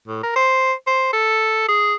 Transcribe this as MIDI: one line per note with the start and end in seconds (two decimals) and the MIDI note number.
0.08 0.23 45
0.23 0.31 70
0.36 0.73 72
0.87 1.10 72
1.13 1.68 69
1.68 1.95 68